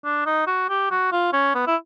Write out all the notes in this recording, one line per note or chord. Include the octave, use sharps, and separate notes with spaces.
D4
D#4
F#4
G4
F#4
F4
C#4
B3
E4